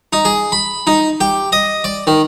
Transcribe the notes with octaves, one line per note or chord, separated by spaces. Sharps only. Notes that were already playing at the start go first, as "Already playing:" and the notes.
D#4
G#4
B5
D#4
G4
D#5
D5
D#3